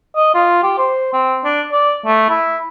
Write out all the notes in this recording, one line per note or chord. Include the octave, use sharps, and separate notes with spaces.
D#5
F4
G4
C5
C4
D4
D5
A3
E4